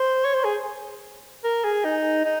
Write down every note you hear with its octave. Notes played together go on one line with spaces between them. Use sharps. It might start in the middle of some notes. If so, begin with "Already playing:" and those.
Already playing: C5
C#5
C5
G#4
A#4
G#4
D#4
D#4